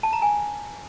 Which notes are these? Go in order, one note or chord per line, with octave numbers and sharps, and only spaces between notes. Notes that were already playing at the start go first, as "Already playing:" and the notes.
A5
A#5
G#5